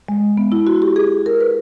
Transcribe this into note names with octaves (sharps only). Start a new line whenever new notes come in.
G#3
B3
E4
F#4
G4
G#4
A#4
B4